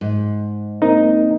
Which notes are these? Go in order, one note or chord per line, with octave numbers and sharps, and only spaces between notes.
G#2
A#3 C4 D#4